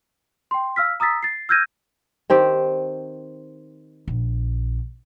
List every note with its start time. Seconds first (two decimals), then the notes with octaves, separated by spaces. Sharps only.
0.51 G5 C6
0.76 F5 E6 F6 B6
1.00 A#5 D#6 E6 A6 B6
1.23 A6 C7
1.49 E6 F6 G6 G#6 A#6 D#7
2.30 D#3 C4 G4
4.08 A#1